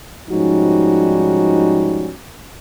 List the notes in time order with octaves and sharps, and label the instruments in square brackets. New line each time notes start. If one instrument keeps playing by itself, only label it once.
[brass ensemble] G#2 F3 G3 C#4 D#4 F#4